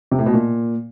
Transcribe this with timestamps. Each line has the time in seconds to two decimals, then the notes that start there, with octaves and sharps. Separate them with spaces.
0.11 C3
0.19 A2
0.26 B2
0.33 A#2